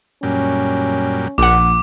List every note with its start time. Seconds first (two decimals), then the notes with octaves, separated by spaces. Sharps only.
0.23 F#2 A#2 G3 C#4
1.38 A#1 F#5 D6